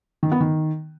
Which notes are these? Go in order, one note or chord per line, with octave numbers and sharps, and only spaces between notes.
D#3
B3
D#3